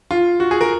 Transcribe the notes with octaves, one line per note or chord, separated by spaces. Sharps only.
F4
F#4
G#4
A#4